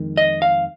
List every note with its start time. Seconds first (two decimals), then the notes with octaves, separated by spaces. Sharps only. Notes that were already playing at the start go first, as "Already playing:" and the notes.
Already playing: F2 D#3 G#3
0.17 D#5
0.42 F5